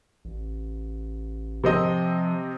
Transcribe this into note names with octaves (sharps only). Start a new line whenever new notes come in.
A1
C3 F3 C4 D#5